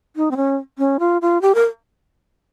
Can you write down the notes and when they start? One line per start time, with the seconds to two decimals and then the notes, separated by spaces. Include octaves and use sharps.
0.16 D#4
0.31 C4
0.36 C#4
0.78 C#4
0.99 F4
1.22 F4
1.42 G4
1.55 A#4